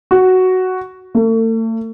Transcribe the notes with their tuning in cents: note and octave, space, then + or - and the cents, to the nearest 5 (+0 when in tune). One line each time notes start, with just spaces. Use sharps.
F#4 +5
A3 +40